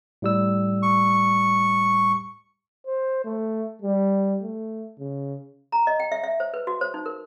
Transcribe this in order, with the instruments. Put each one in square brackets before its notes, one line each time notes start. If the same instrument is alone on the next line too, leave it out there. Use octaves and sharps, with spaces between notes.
[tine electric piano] A2 G3 E6
[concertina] C#6
[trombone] C5
A3
G3
A3
C#3
[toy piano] A#5
D#5
G5
E5
E5
C5
B4
F#4
C5
D#4
A#4